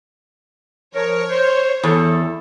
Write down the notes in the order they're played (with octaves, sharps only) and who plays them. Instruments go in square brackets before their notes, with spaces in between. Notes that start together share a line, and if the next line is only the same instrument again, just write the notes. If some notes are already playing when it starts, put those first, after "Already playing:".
[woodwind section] F3 A#4 [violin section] C#5
[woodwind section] C5
[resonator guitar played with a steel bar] E2 [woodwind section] A4